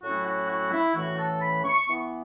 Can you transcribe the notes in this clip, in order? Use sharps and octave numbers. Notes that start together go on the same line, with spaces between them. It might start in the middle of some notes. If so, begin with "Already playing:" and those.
A2 F#3 A3 C#4 E4 F#4
F#4
F#4
E4
A2 E3 A3 C#4 F#4
A4
B5
C#6
E3 B3 E4